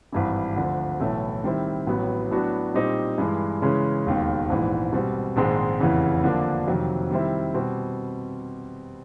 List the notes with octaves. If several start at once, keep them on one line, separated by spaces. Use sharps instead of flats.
G#1 G2 E3
D2 D3 F3
B1 A2 E3 A3
D#3 G3 C4 E4
A1 A2 F#3 B3
A2 F#3 B3 D4 F#4
A#2 G3 C4 D#4 G4
G2 E3 G#3
C#3 E3 G#3 C#4
E1 D#2 D#3
A#1 G#2 E3
B2 G3 C4
A#1 G#2 D#3 G#3 C4
F1 E2 C#3 E3
D3 F3 A#3 D4
F2 C3 D#3 F#3
D#3 G3 C4 E4
B2 G3 C4